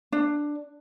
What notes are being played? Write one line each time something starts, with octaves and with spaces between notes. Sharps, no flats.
D4